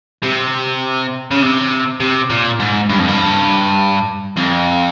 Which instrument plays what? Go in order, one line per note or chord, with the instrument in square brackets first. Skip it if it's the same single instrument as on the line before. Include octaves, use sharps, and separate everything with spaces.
[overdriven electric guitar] C3
C#3
C3
C3
A#2
G#2
G2
F2
G2
F2